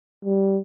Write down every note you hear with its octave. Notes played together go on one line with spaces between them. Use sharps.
G3